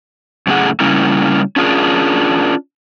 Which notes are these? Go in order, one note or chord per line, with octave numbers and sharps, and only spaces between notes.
F#2 A2 C#3 A3 G#4 F#5
C#3 G3 A#3 C#4 E4
C#4 D4 F4 G#4 A#4